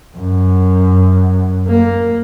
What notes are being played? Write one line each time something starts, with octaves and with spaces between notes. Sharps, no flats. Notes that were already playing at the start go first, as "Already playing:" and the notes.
F#2
A#3